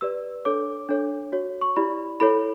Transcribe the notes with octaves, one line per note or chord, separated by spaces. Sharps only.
G4 B4 D5 E6
D4 A4 C#5 D6
D4 A4 C#5
F#4 C#5
C#6
E4 G4 D5 B5
E4 A4 C#5 B5